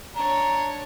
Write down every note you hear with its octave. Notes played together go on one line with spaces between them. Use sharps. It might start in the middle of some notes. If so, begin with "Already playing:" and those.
D4 C#5 A#5